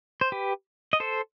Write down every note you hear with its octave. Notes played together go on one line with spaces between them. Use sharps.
C5
G4 B4
D#5
A4 C5